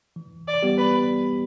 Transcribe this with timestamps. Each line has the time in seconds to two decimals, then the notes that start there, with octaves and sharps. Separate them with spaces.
0.16 E3
0.48 D5
0.63 G3 B3 G4
0.78 B4